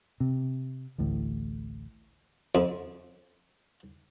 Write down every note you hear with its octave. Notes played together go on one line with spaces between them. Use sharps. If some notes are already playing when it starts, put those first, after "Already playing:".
C3
A1 D2 A2
F2